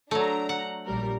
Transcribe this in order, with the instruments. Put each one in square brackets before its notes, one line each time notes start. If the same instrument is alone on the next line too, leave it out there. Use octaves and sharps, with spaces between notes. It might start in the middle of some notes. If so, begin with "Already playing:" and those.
[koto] F#3 A3 [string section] D4 A#5
[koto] F#5
[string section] A#1 G3 A#4